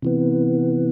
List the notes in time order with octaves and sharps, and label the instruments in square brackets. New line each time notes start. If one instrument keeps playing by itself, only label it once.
[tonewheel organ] C3 E3 B3